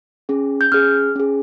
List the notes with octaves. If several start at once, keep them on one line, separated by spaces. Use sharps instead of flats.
C#4 G#4
G6
C#4 G#4 F6
C#4 G#4